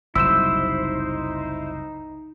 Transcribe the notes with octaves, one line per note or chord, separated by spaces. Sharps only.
F#1 C2 F#3 D#4 E4 C5 E6 E7